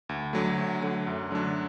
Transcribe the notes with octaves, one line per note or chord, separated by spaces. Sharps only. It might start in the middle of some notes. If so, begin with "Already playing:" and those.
D2
D3 F#3 A3
D2
D3 F#3 A3
F#2
D3 F#3 A3 D4